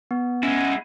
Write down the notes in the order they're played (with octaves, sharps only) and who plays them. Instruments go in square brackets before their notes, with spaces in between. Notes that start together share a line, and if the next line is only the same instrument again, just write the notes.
[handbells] B3
[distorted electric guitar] G#3 E4 [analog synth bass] C#4 [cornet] F#5